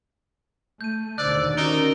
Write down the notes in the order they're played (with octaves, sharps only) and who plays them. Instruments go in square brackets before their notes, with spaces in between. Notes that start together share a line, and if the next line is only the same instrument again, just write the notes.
[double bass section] A3 [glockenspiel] G6 D#7
[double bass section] D#2 B2 D3 [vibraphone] C5 E6 [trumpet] D5 [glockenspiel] F#6
[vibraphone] C#4 F#4 A#4 [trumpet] D#4 [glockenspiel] D7 G7